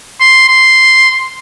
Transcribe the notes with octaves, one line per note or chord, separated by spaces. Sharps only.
C6
C6